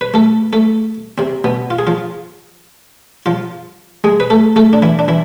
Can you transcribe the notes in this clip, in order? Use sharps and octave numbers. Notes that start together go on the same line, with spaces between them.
B4
A3 A4
A3 A4
C3 C4
B2 B3
F4
G#4
F3 F4
F3 F4
G#3 G#4
B4
A3 A4
A3 A4
D4
E3 E4
D4
E3 E4